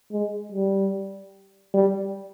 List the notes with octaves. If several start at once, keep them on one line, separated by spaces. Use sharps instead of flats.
G#3
G3
G3